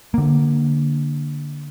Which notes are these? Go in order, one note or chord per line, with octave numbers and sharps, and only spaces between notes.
D3 A#3